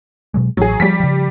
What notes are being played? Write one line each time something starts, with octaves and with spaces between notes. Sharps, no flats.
B2 F#3 G#3
A1 F#3 G#4
F3 G3 B6
C#3 F3